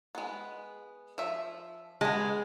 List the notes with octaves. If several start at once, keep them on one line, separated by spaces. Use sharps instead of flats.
G#3 B3
F3 E5
G#3 B3 A5